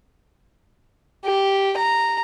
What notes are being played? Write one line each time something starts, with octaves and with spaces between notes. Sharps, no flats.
G4
A#5